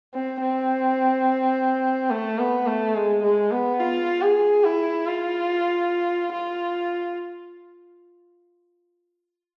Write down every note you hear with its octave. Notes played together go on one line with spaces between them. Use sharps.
C4
C4
A3
B3
A3
G#3
G#3
B3
F4
G#4
E4
F4
F4